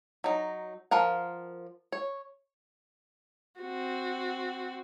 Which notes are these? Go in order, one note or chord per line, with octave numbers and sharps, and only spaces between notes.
F#3 D#4
F3 F4 A#4 F#5
C#5
C4 F#4